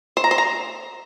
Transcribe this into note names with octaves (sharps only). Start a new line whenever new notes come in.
C5
A#5
C5
A#5